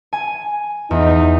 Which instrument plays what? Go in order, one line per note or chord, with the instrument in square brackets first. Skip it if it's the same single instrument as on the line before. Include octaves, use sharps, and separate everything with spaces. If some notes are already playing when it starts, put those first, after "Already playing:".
[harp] G#5
[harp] E2 [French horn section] D#4